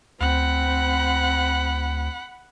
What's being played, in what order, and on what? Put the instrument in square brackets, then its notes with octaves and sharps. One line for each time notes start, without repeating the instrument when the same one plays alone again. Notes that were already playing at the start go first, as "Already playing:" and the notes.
[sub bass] D2 [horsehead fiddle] C4 [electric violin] F#5 B5